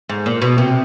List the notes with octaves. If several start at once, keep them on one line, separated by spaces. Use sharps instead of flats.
G#2
A#2
B2
C3